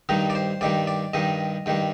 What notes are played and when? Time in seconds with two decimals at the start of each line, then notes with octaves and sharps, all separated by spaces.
0.09 G2 D#3 G3 D#4
0.30 D5
0.35 C5
0.61 G2 D#3 G3 D5
0.87 D5
1.14 G2 D#3 G3 D#5
1.66 G2 D#3 G3